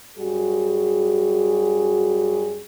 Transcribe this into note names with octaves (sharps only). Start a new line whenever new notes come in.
F#2 G3 F#4 G#4